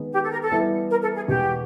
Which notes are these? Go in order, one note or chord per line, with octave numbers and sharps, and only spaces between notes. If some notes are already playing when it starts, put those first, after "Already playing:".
Already playing: D#3 G#3 B3
G4
A4
A#4
A4
E3 G3 B3 E4
A#4
A4
G#4
E2 B2 G#3 G4